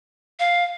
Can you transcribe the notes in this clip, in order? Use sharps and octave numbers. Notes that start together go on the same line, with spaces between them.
F5